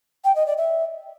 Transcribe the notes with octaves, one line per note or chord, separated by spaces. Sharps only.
G5
D#5
D5
E5